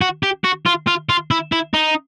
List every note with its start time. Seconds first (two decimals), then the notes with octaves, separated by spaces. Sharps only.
0.02 F#4
0.23 G4
0.45 F#4
0.66 F4
0.88 F4
1.10 F4
1.31 E4
1.52 E4
1.74 D#4